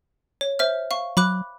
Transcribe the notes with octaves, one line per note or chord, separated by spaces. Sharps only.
C#5
C5 E5 F6
F5 C#6
F#3 B5 D6 F#6